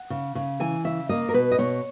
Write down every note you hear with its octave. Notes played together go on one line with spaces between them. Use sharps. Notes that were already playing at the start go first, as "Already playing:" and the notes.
Already playing: F#5
C#3
C#3
E3 G#5
C#3 E5
A#3 D#5
A#4
B2 B4
D#5
B2 C#5